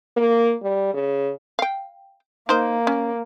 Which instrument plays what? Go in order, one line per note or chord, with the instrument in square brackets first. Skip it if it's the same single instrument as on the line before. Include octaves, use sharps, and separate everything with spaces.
[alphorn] A#3
G3
C#3
[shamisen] F5 G5
[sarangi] A#3 [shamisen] D#4 A#4 C5
[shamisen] C#4